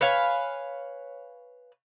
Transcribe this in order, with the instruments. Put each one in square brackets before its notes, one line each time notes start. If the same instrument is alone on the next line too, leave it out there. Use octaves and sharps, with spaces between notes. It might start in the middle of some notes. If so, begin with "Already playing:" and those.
[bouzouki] B4 C#5 F5 G#5